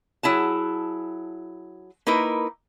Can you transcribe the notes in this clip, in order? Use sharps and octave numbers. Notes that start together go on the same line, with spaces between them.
F#3 E4 G#4 A5
A#3 D#4 E4 A#4 B4